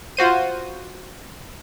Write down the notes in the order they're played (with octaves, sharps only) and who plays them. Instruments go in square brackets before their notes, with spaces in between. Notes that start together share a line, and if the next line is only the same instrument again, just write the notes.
[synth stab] F4 F#4 C5 D#7